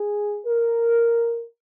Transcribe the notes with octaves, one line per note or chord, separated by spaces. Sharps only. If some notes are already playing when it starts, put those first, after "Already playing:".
Already playing: G#4
A#4